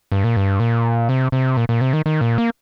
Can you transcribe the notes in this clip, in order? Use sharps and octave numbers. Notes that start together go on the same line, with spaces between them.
G2
A#2
G2
A#2
C3
C3
A#2
A#2
C3
D#3
D#3
A#2
A#3